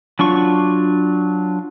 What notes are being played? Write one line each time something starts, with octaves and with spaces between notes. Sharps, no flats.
F#3 D4 F4 C#6